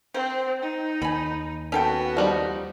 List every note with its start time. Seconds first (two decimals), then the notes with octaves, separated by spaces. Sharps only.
0.14 C4 C5
0.61 D#4
1.02 D#2 G#5 B5
1.72 B3 C#4 F#4 A4 G5
2.17 F3 G3 D#4